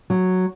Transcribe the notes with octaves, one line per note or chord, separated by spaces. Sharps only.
F#3